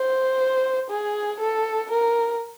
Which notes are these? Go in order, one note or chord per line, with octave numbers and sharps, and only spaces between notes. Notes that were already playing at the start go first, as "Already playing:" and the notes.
Already playing: C5
G#4
A4
A#4